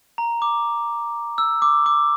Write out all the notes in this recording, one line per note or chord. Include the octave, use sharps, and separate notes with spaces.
A#5
D6
E6
D6
D6